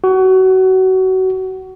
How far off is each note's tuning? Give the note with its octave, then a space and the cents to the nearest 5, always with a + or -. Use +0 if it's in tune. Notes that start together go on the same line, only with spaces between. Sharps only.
F#4 +25